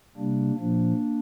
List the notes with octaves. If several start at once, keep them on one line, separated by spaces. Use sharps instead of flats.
C3 G3 A#3 D4
A#2 F3 A#3 D4